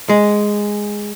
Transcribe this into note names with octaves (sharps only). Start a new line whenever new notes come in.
G#3